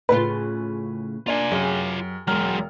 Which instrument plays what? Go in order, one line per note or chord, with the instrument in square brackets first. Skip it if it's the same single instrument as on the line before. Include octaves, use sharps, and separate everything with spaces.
[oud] A2 C#3 F4 [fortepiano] B4
[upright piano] A#3 D4 [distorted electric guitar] F4 G#5
[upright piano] F#2 [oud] G4 G#4
[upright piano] E1 A#5 F6 [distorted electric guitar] F#3 G#3